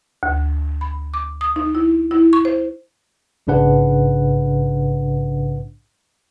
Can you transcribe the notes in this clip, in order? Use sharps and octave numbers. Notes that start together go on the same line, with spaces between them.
D2
B5
D6
D#6
D#4
E4
E4
C#6
C5
A#1 G#2 C#3 D4 B4 F#5